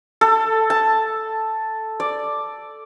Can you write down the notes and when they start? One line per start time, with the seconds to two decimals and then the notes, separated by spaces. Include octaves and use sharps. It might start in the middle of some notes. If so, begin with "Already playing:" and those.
0.21 A4
0.70 A5
2.00 D5